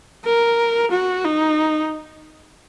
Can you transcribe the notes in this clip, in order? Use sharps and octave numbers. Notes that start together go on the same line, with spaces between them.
A#4
F#4
D#4